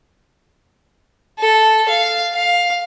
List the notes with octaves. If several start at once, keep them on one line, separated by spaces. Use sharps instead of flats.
A4
F5
F5